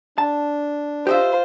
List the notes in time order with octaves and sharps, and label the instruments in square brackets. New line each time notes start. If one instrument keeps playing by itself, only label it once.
[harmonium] D4 [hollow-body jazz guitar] A5
[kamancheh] F4 C5 [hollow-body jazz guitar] G4 D#5 E5